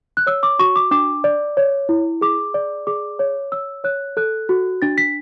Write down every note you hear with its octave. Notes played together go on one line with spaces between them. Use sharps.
F#6
C#5 E6
D6
F#4 C#6
D6
D4 D6
D5
C#5
E4
G#4 D6
D5
G#4 D6
C#5
C#5 E6
C#5 F#6
A4 F#6
F#4
D4 A6
B6